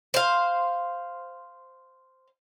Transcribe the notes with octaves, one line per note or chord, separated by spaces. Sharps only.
C5 F5